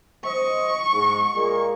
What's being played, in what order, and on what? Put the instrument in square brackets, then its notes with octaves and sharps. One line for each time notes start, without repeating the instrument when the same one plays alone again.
[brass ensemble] C5 D#5 [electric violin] C#6
[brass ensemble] G#2 G#3
A#2 G#3 A#3